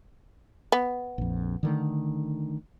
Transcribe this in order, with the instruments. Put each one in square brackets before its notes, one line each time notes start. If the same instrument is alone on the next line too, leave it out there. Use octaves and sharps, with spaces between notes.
[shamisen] B3
[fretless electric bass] A#1 F2
D3 D#3 A3